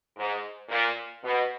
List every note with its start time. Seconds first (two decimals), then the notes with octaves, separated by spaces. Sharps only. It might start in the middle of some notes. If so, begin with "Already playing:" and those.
0.17 G#2
0.69 A#2
1.23 B2